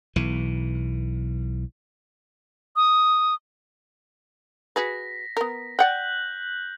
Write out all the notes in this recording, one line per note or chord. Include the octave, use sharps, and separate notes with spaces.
B1 E3
D#6
F#4 G#4 B4 A#6 B6
B3 A#4
D5 F#5 G5 F#6 G6 F#7